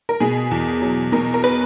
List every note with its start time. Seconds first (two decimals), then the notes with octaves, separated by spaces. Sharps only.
0.09 A#4
0.20 B2 G#4
0.51 E2
0.82 F#3
1.12 B2 A#4
1.34 A#4
1.44 B4